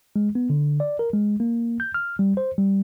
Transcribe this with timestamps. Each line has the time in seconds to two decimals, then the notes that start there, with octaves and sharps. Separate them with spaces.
0.16 G#3
0.35 B3
0.50 D3
0.80 D5
0.99 A#4
1.13 G#3
1.40 A#3
1.80 G6
1.94 F6
2.19 G3
2.37 C5
2.58 G3